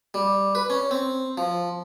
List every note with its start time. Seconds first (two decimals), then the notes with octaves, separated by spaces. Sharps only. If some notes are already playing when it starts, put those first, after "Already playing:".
0.14 G3
0.55 B4
0.70 C#4
0.91 C4
1.38 F3